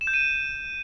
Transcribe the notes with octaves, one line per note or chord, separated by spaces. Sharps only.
E7
G6
D#7